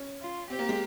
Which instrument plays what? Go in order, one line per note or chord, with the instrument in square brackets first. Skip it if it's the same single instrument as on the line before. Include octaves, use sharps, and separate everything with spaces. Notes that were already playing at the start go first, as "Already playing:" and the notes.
Already playing: [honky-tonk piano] C#4
[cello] F4
[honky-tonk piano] C4 [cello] G4
[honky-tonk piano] A#3
G#3